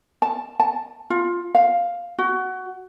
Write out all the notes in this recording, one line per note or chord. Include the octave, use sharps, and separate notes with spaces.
A5
A5
F4
F5
F#4